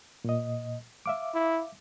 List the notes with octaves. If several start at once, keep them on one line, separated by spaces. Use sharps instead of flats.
A#2 D#5
E5 F5 D6
E4